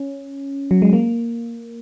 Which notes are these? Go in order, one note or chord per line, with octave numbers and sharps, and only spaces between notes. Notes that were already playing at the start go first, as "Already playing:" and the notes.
Already playing: C#4
F#3
G#3
A#3